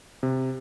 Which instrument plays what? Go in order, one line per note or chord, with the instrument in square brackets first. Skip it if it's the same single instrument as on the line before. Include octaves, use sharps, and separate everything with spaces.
[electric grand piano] C3